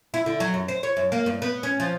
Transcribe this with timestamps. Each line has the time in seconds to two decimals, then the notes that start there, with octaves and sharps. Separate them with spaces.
0.14 E4
0.26 D3
0.40 F#3
0.54 F#2
0.68 C5
0.83 C#5
0.97 F#2
1.12 A#3
1.26 G2
1.42 B3
1.63 C#4
1.80 F3